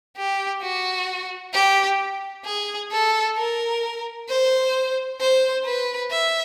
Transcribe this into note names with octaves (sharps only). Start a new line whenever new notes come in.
G4
F#4
G4
G#4
A4
A#4
C5
C5
B4
E5